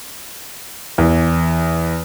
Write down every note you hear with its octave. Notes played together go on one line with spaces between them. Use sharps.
E2